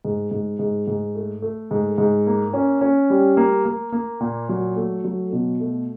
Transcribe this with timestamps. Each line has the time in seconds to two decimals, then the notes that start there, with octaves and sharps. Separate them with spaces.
0.05 G#2
0.31 G#2
0.59 G#2
0.87 G#2
1.15 A3
1.42 A3
1.71 G#2
1.98 G#2
2.27 A#3
2.54 C#4
2.81 C#4
3.10 G3
3.37 A#3
3.65 A#3
3.92 A#3
4.20 A#2
4.49 F#3
4.76 A3
5.05 F#3
5.33 B2
5.60 A3